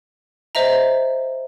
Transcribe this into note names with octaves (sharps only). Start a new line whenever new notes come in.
C5 D#5 E5 A#5